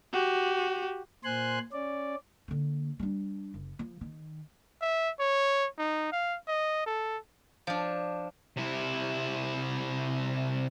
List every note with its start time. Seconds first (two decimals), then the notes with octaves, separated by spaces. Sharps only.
0.13 F#4 G4
1.24 A#2 C5 G#5 C6 F#6
1.72 C#4 D5
2.48 D3 A#3
2.99 G3 D4
3.54 F#1
3.79 F3
4.01 D#3
4.81 E5
5.20 C#5
5.78 D#4
6.12 F5
6.47 D#5
6.86 A4
7.67 F3 D4
8.57 C3 E4